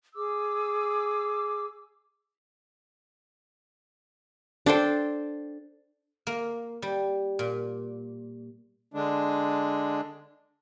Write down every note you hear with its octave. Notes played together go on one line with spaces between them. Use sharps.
G#4 D6 E6
D4 A4 C5 G5
A#3
G3
A#2
D3 G#3 D4